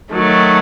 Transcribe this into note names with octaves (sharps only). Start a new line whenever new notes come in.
D#3 F#3 A3